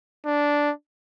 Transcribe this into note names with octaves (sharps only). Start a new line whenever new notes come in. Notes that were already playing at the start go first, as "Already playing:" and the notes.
D4